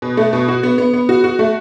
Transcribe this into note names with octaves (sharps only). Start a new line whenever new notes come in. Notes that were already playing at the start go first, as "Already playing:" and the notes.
B2
A3
B2
F#4
B3
B3
B3
F#4
F#4
A3